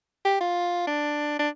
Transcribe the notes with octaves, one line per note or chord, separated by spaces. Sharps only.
G4
F4
D4
D4